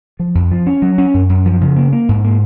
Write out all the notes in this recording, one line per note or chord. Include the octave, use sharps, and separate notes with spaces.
F3
F2
F3
C#4
F#3
C#4
F#2
F#2
F3
C#3
A#3
A#3
G#2
A#3